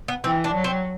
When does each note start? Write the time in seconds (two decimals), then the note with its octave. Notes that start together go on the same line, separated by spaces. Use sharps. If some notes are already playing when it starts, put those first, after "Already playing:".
0.08 B3
0.24 E3 C4
0.44 D4
0.54 F#3
0.64 C4